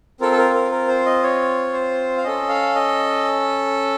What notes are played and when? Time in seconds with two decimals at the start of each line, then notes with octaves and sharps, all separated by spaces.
0.21 C4 F4 A4 A#4
0.32 A4
0.37 A#4
0.54 A#4
0.72 A#4
0.88 C5
1.06 D#5
1.23 C#5
1.73 C5
2.18 F5
2.24 C#4 A4 D#5
2.49 F5
2.75 D#5